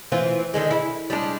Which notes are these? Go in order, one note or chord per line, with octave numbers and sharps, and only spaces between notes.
E3 C4 F4
D3 D#3 G#3
E4
G3 G#3 D4